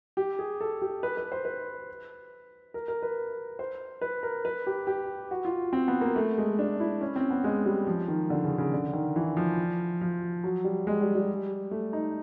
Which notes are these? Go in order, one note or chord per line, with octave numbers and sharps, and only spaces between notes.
G4
G#4
A4
G4
B4
B4
C5
B4
A#4
A#4
B4
C5
B4
A#4
B4
G4
G4
F#4
F4
C4
B3
A#3
A3
G#3
D4
E4
C#4
C4
B3
G#3
G3
F3
D#3
D3
C#3
C#3
D3
D#3
E3
F3
F3
F#3
G3
G#3
G3
G3
A3
D#4